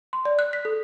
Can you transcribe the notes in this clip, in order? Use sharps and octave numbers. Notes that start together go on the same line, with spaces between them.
C6
D5
F#6
B6
A4